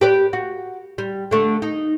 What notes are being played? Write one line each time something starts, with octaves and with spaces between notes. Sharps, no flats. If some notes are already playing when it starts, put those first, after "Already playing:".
G4 B4 D5
F#4
G3
D3 A3
D#4